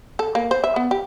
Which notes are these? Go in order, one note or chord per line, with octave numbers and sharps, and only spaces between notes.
A4
A#3
C5
E5
B3
G4